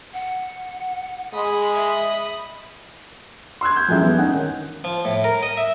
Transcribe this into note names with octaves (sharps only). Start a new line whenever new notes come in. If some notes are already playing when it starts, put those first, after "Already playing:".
F#5
G#3 D#5 B5
E5
C6 E6 F#6 G#6
G6
D#1 A#1 F#2 G#3 E4 G6
B3
C#4 D#4 F#5
D#3
F3
A2
A#4
D#5
E5